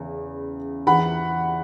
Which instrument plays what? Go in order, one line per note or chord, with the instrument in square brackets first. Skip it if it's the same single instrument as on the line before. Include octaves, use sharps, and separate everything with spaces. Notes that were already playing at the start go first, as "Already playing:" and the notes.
Already playing: [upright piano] E2 C#3
E2 E3 F#5 B5